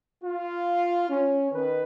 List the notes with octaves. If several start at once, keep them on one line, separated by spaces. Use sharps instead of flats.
F4
C#4
D#3 B4